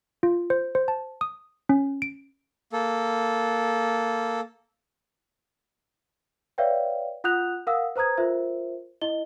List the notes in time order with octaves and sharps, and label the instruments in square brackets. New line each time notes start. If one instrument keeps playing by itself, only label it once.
[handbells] F4
C5
C5
A5
D#6
C#4
D7
[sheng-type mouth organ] A#3 A4
[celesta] B4 C#5 D5 E5 F5 G5
F4 F#5 D#6 F#6 G6 F7
A#4 F5 F#5 D#6 E6
B4 C5 A#5 D#6 G#6
F4 A#4 C5 E5
E4 D#5 G7